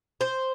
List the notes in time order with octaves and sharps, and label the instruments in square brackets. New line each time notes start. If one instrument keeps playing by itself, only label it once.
[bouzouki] C5